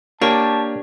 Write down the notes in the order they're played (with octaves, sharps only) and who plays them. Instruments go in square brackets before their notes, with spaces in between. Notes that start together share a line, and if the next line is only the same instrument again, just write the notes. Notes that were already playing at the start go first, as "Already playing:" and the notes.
[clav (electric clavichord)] A#3 [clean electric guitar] D4 C#5 [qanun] G4 [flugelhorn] A5